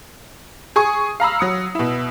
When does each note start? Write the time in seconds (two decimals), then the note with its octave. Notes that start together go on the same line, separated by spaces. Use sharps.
0.76 G#4 G#5 C#6 D#6
1.20 F5 A#5 B5 E6
1.39 F#3 D#6 C#7
1.75 B2 E4